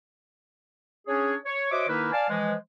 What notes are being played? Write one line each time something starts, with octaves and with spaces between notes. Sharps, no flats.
C#4 D4 G#4 C#5
C#5
F#4 C5 C#5 D#5 E5 D6
D#3 A#3 D#4 E4 B4
D5 F5 G#5 A5
E3 F3 G#3